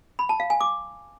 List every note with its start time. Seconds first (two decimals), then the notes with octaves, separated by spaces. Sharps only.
0.19 B5
0.29 A5
0.40 F5
0.50 G#5
0.61 D6